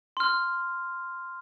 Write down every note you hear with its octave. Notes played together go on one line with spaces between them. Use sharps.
C6 F6